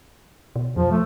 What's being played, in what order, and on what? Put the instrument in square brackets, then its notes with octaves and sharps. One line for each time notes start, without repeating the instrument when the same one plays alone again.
[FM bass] B2
[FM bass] F2 [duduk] F3
[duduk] A3